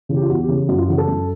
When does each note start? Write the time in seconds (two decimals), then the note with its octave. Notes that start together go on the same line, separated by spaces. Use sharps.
0.09 C#3 E3
0.16 G4
0.22 F4
0.29 E2 F#4
0.42 G4
0.48 C#3 E3
0.68 F#2 F#4
0.78 F4
0.88 C#3 E3 F#4
0.98 A4
1.08 F#2